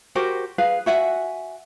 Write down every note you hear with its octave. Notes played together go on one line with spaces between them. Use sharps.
F#4 G4 A#4 C5
G#4 B4 F5
F#4 E5 F#5 G#5